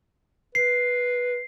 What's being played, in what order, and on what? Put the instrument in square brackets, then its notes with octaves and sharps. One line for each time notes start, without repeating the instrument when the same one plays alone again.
[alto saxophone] B4 [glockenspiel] C7